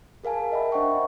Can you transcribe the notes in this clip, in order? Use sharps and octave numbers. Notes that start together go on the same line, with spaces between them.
G#4 A#4 F5 G#5 A5
D#5 E5 G5 B5
D4 C5 D#5 F#5 G5 C#6